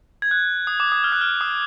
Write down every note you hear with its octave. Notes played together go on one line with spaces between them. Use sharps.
G#6
F#6
D#6
D6
D#6
F6
F#6
F6
D#6